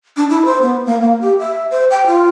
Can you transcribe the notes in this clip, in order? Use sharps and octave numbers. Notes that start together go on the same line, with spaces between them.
D4
E4
C5
B3
A#3
A#3
G4
E5
C5
G5
F4